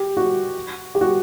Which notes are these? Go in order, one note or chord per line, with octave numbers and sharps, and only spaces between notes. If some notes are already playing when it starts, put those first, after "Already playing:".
Already playing: G4
F#4
G4
F#4